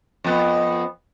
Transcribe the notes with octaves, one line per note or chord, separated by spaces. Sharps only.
F2 B3